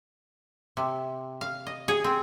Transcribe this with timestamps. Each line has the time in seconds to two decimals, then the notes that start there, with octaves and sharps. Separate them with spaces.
0.77 C3
1.41 F5
1.67 D#5
1.88 G#4
2.04 C4